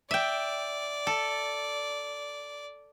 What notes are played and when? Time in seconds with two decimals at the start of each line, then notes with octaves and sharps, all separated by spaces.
0.11 D5 E5 G5
1.07 A4